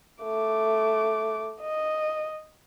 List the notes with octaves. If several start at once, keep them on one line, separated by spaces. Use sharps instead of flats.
A3 D6
D#5